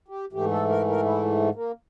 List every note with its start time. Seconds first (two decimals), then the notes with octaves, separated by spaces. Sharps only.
0.08 G4
0.33 G#2 E3 A3 G4
0.51 A4
0.69 A#4
0.88 A#4
1.05 E4
1.55 A#3